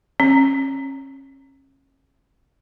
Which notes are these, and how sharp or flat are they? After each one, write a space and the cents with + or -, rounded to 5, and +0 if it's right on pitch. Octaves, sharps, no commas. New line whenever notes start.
C#4 -35